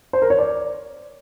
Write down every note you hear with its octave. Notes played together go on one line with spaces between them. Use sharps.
C5
A#4
C#5
D5